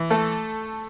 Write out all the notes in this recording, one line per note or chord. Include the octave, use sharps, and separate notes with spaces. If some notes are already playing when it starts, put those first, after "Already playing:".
Already playing: E3
A3 A4